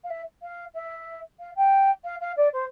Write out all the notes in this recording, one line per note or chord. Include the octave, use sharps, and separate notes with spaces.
F5
E5
F5
E5
F5
G5
F5
F5
D5
C5